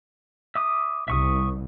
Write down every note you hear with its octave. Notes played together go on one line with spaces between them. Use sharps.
E5 D6 D#6
C2 E5 C#6 D#6